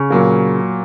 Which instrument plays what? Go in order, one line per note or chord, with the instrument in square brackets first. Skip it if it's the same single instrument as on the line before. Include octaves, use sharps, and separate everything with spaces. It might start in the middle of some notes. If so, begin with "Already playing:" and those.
Already playing: [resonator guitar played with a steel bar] C#3
[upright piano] A#2 F#3 A#3